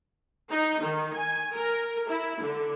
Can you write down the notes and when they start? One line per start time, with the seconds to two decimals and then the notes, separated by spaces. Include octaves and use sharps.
0.50 D#4
0.82 D#3
1.14 G#5
1.54 A#4
2.08 E4
2.41 D3